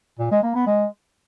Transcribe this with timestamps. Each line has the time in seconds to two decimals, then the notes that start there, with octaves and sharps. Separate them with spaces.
0.19 A#2
0.31 G#3
0.43 A#3
0.55 B3
0.66 G#3